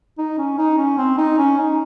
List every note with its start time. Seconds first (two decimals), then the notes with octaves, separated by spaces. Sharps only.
0.18 D#4
0.38 C#4
0.58 D#4
0.78 C#4
0.97 C4
1.18 D#4
1.38 C#4
1.58 D#4